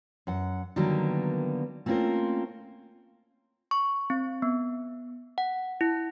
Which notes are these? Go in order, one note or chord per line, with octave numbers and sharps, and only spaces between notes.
F#2 F#5
D3 D#3 F#3 G3 A#3 B3
A3 A#3 C4 C#4 F4 A#4
C#6
C4
B3
F#5
E4